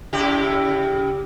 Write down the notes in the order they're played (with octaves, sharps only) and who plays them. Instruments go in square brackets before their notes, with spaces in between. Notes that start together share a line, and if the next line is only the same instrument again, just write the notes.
[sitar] C#3 E4 G4